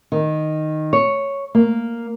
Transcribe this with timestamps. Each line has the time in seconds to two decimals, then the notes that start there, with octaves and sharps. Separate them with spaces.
0.12 D#3
0.93 C#5
1.55 A#3